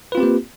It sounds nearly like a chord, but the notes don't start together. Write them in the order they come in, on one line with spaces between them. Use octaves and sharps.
B4 F4 C4 G4 A#3